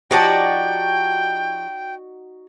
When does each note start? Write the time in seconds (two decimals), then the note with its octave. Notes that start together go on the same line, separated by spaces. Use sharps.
0.11 F3 D#4 F#4 G4 D5 G5